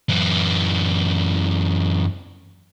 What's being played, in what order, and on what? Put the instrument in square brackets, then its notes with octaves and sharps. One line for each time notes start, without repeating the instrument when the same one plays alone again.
[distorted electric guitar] F#2 E3